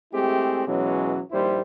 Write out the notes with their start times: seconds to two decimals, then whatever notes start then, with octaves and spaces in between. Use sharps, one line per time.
0.13 G#3 A3 C4 E4 G4 G#4
0.66 B2 E3 F#3 G#3 C#4
1.31 A#1 D#2 G3 E4 C5